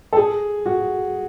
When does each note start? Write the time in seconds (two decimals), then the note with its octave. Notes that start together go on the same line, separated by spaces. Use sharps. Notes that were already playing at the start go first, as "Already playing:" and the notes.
0.13 A4
0.17 G#4
0.66 F#4